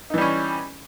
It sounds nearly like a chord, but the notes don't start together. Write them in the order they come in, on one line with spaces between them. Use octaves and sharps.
D#4 E3 G3 C#4